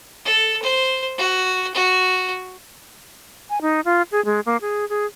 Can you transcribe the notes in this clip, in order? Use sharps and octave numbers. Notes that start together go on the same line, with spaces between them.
A4
C5
F#4
F#4
G#5
D#4
F4
G#4
G#3
A#3
G#4
G#4